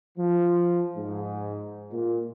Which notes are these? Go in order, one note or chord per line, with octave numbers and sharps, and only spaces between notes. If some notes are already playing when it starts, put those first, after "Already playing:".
F3
G#2
A#2